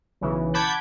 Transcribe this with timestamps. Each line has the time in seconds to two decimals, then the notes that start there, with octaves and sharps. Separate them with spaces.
0.21 B1 C#3 E3
0.54 F#5 A5 B5 D6 G6 G#6